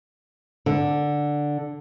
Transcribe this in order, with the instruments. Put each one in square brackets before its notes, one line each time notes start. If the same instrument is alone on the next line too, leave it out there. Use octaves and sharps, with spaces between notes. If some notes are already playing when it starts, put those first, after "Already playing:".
[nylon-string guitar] D3